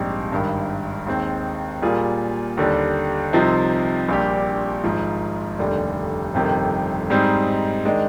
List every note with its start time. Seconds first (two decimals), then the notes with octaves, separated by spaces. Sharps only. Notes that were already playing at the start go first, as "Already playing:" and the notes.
Already playing: A#1 G#2 G3 C4 G4
0.32 G#1 G2 D#3
1.07 D#2 D#3 G#3 C4
1.82 A#2 G3 A#3 F4 G#4
2.57 D#2 D3 G3 D4
3.33 C2 C3 F3 C4 D#4
4.09 A#1 A#2 G3 D4 G4
4.84 G#1 G#2 F3
5.59 F1 D#2 D3 G3
6.34 G1 F2 C3 D#3
7.10 G#2 G3 C4 D#4
7.85 D#3 G#3 D4